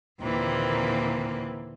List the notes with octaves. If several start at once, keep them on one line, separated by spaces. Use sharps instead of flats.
D#2 A#2 D3 E3 A#3 C4